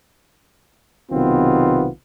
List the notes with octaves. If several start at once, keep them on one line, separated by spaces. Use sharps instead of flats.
B1 C3 D#3 B3 C4 F4